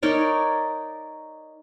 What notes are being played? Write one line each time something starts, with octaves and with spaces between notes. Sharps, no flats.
D#4 A#4 C#5 D5